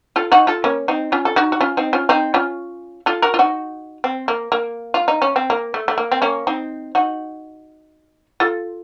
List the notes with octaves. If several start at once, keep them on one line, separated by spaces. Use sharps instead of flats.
F4 A4
D#4 F#4
F4 A4
A#3 C#4
C4 D#4
C#4 F4
A4
D#4 F#4
F#4
C#4 F4
C4 D#4
C#4 F4
C4 D#4
C#4 F4
F4 A4
F#4 A#4
F4
D#4 F#4
C4
A#3
A#3
F4
D#4
C#4
C4
A#3
A3
A3
A#3
C4
A#3 C#4
C4 D#4
D#4 F#4
F4 A4